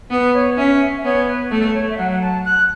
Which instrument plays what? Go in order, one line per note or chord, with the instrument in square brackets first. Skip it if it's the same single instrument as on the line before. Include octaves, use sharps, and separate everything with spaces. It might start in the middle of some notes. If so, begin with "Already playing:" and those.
[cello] B3 [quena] B4
[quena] C#5
[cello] C#4 [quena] E5
[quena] E5
[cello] B3 [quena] C#5
[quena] B4
[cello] A3 [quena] A4
[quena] C#5
E5
[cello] F#3 [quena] F#5
[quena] F#5
A5
F#6